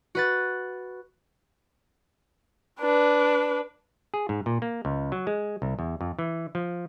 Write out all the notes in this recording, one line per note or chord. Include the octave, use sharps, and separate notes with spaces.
F#4 B4 A6
D4 B4
G#4
G#2
A#2
A#3
C#2
F#3
G#3
C2
E2
F2
E3
F3